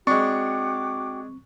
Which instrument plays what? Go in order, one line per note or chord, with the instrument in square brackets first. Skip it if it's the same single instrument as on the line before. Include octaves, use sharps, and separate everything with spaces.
[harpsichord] G#3 D4 [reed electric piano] C4 [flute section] F#4 G5 D6 [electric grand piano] C#6